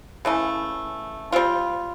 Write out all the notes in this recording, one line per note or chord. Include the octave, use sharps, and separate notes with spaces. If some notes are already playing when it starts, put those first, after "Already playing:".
C#3 E3 A3
G3 C4 F4